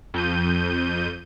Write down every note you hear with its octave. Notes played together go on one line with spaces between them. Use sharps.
F2 G6 D#7